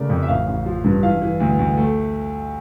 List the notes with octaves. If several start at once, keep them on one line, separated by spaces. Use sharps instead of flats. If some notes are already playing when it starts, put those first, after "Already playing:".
Already playing: C#3 A3 A#4 D5
F2
E5
A1 F5
A1
F3
G2
E3 F5
E3
D2
D2
A3